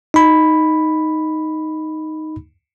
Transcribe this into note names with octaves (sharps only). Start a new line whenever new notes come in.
D#4 B5